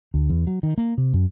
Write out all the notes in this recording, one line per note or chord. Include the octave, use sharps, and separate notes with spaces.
D2
E2
F#3
D#3
A#3
C3
F#2